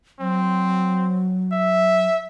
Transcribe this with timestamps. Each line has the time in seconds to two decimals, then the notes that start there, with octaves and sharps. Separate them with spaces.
0.20 F#3 C4
1.52 E5